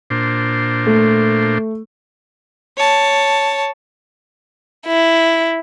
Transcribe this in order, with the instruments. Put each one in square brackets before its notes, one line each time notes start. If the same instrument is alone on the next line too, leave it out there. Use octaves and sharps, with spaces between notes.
[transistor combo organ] A#2 D4 C5
[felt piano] A3
[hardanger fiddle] C#5 A5
[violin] E4